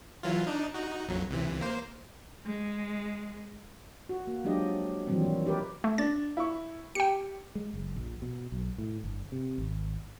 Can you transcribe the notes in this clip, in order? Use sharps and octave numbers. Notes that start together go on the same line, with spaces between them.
E3 F#3 F4
D4 D#4
D#4 F#4
A#1 F2 F#3
C#2 C3 E3
A#3 C5
G#3
F#4
A#3
F3 F#3 G#3 D4 G4 D#5
A#2 D#3 E3 F#3 G3 C4
A#2
D#4 G4 A#4 B4 D5
A3
D4 A6
E4 C#6
G4 G5 C#7
G#3
F#1
A#1
B2
B1
A2
G1
C3
G#1